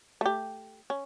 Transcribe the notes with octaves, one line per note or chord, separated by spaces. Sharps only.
A3 G4
C#4